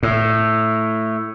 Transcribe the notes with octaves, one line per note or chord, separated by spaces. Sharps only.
A2